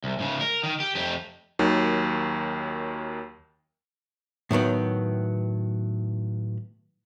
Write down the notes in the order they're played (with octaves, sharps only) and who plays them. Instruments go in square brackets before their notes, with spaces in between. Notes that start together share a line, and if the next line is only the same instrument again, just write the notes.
[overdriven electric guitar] C2
G#2 C#3
A#4
D#3
G4
F2 G4
[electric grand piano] D#2 D#3 F#3
[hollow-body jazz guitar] A2 D#3 F#3 B3